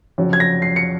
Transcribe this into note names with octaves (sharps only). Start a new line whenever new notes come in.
F1 F2 C#3 F#3
G#6
A#6
C7
C#7